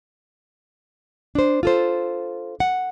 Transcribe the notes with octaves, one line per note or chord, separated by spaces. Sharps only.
D4 C5
F4 A4 C5
F#5